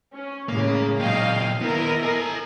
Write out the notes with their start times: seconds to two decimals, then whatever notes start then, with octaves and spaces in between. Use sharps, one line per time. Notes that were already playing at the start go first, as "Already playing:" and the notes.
0.13 C#4
0.49 A2 C#3 G#3 A#3
1.00 A#2 F#3 D#5 F5 G5
1.61 D#2 B3 E4 A#4 D#5
2.03 A4 G#5